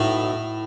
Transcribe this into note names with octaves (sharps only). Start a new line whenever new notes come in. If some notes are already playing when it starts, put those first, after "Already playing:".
Already playing: B1 A2